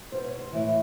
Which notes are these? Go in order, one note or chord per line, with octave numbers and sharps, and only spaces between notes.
B2 C5
C#5
C5
A2 E3